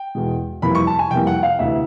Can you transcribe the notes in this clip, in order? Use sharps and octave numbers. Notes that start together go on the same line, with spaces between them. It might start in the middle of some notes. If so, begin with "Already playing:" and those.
Already playing: G5
E2 B2 G#3
F2 C3 E3 G3 A#3 B5
C#6
A5
G#5
F2 C3 E3 G3 A#3 G5
F#5
F5
D2 C3 E3 E5